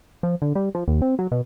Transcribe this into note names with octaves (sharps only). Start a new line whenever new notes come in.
F3
D3
G3
F3
D#2
C4
F#3
B2